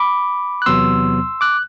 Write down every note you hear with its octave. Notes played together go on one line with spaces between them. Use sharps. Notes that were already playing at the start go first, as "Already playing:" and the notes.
Already playing: B5 D6
F#6
E2 C3 F#3 B3 C6 E6
D6 F#6